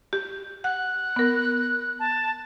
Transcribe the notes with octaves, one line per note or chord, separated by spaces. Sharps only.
G4
F#5 F#6
B3 A#4
A5